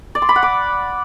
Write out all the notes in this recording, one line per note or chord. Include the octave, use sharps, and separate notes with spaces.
D5
C6
B5
F#5
D6